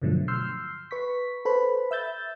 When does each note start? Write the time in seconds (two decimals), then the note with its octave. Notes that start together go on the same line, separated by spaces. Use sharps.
0.02 G2 B2 D3 F3 F#3 A3
0.28 C6 E6 F6 G6 C7
0.91 B4 C#6 B6
1.45 A4 B4 C5 B5
1.91 E5 E6 G6 A6